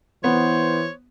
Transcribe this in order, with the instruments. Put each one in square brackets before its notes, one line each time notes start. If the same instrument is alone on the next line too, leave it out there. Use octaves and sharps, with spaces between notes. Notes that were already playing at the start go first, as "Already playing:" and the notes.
[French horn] E3 [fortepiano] B3 [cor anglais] C5 [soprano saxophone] C#5